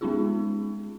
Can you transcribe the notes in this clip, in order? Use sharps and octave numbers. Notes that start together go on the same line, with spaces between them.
G#3 B3 C#4 D#4 F4 G#4